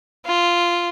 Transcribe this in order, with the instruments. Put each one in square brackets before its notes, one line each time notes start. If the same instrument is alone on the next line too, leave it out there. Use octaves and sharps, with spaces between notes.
[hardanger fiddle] F4